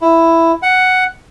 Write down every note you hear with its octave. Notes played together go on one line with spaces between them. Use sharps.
E4
F#5